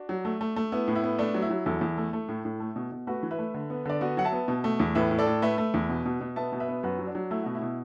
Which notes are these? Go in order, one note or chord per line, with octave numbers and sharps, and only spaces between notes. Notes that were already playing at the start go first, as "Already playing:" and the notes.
Already playing: D4 F#4
F#3
A3
A3
A3
B3 E4
A2
E4
B3
A3 D4
F#3
E4
F#3
E2 E4 A4
E2
A3
A3
A2
A2
A3
B2
B2
A3 F#4 B4
E3
B4 E5
A3
D3
B3
D3 D5
B3 F#4 B4
F#3 F#5
E5 A5
B3
B2
A3
E2
A2 B4 E5
A2
A4 D5
A2
A3 B4 E5
A3
E2
B2
B2
B2
B3 E5 A5
B2
B4 E5
B3
F#2 F#4 B4
F#3
D4
F#3
A3 E4
B2 F#4
E4
B2